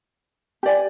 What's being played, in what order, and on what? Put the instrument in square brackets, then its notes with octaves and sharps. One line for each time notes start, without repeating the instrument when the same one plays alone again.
[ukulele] G4 D5 G#5